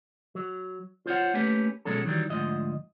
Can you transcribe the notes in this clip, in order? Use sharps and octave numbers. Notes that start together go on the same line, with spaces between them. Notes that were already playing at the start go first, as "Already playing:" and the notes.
F#3
F4 C5 C#5 F#5
A3 A#3 C#4 G4 B4
B2 F#3 G#3 C#4 A4
D#3 E3 F#3 G3
D2 G#2 F3 D#5